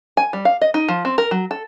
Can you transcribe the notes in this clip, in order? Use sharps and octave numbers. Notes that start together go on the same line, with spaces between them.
G#5
G3
F5
D#5
D#4
F3
C4
A#4
F#3
A4